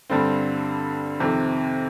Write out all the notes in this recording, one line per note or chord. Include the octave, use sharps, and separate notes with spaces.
G2 D3 G3 C4
F2 C3 D#3